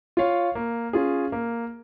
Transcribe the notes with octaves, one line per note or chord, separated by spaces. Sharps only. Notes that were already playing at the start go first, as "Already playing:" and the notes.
F4 C#5 F5
A#3
C#4 F4 G#4
A#3